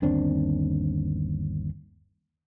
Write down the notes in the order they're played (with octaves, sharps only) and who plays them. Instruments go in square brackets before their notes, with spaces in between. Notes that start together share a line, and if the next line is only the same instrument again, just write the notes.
[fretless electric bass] G1 D#2 C4 D4